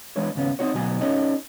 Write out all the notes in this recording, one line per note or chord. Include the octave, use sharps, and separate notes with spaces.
E3 G#3 D4 B4 C#5
D#2 G#2 C#3 B3 C#4
C4 D#4 F#4 C#5
D2 B2 F#3 G#5
C#4 D#4 F#4 A4 C#5 D#5